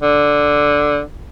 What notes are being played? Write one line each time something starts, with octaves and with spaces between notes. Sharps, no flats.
D3